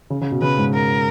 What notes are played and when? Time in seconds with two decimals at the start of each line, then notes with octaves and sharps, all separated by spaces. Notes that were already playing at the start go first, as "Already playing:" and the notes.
0.10 C#3
0.21 C#3
0.31 B2
0.42 C#3 B4
0.57 G#2
0.74 A#4